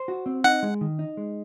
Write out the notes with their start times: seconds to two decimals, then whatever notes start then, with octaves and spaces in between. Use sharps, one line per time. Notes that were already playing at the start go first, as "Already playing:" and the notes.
Already playing: C5
0.08 F#4
0.26 C4
0.44 D#4 F#5
0.63 G#3
0.81 D#3
0.99 D#4
1.17 G#3